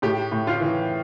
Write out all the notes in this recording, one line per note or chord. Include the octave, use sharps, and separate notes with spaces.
A2 G4
A2
F4
E3